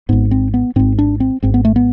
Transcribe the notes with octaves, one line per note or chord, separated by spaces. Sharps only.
G#1 G#2 B3
C4
B3
G#1 G#2 C4
D4
C4
G#1 G#2 C4
B3
A3
B3